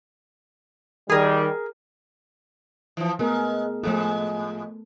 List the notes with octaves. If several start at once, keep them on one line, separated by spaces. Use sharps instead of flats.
D#3 G3 G#4 A#4
E3 F3
G#3 A3 B3 A#4
A2 F3 G#3 A3 A4